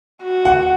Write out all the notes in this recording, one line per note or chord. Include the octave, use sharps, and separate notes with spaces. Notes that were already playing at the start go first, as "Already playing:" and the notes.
F#4
F#5